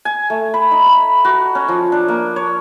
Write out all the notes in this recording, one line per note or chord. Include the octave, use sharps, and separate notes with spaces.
G#5
A3
B5
D#4
B5
F#4
C#4
F3
D4
A#3
C#5